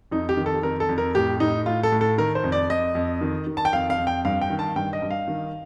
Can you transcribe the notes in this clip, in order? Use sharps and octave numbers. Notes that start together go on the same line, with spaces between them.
F2 D#4
G4
D#3
A4
F2 A#4
A4
F2
A#4
A2 G4
A2 D#4
A2 F4
A4
A2
A4
D#3 A#4
C5
F2
D5
F2 D#5
F2
D#3
D#3
A5
G5
F2 F5
F5
F2
G5
G2 F5
G5
D#3
A5
G2 G5
D#5
G2
F5
D#3